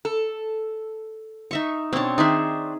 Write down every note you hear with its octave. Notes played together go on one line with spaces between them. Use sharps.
A4
D#4 E5 C#6
B2 C4 D4 C#5
D#3 C4 D4 D#4 G#4 E5